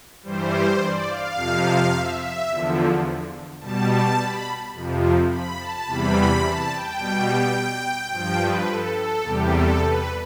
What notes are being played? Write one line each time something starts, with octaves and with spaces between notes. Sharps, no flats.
G2 E3 G3 C5
D5
F5
F2 C3 F3
E5
E5
E2 D3 F3
B2 G3 A5
A5
B5
F2 C3 F3
B5
A5
E2 C3 E3 G3 B5
A5
G5
B2 G3
G2 F3 G5
B4
A4
A4
E2 C3 G3 G4
A4
B4